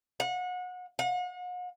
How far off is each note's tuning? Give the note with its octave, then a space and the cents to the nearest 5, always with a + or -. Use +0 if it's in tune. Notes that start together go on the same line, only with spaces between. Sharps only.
F#5 -30
F#5 -40